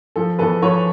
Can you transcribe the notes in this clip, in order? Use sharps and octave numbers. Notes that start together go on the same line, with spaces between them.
F3 A4
E2 A4 B4
F3 B4 C#5